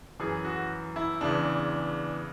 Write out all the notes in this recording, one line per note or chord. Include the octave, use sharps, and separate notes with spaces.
F#2 E3 G#4
F#4
E4
E2 C#3 E3 D4